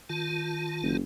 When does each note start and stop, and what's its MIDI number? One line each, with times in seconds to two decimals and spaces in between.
0.09 0.97 51
0.09 0.97 65
0.09 0.97 81
0.82 1.01 30